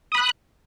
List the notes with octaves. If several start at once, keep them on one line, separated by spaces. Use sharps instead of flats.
B5 D#6 F#6